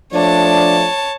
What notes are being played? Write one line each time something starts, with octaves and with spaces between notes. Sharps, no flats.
F3 A3 D4 C#5 A5